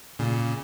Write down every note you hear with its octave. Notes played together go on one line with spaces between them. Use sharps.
A#2 C#3